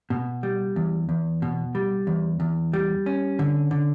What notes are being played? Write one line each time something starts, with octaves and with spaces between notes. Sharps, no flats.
B2
G3
E2
E2
B2
G3
E2
E2
G3
C#4
D3
D3